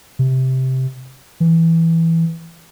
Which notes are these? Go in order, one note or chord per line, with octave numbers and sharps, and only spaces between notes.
C3
E3